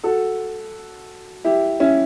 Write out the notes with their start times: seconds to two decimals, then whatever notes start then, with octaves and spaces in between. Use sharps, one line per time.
0.04 F#4 A4
1.45 E4 G4
1.80 C#4 E4